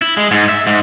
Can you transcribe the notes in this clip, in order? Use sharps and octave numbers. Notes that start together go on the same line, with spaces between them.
E4
G#3
G#2
E5
G#2